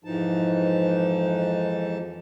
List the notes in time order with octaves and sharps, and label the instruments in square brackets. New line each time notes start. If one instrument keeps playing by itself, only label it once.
[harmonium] F2 G#2 E3 F3 D#4 A5